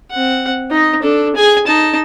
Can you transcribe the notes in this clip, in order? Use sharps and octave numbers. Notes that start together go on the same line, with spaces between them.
C4 F#5
D#4 D#5
D4 A4
G#4 G#5
D#4 A5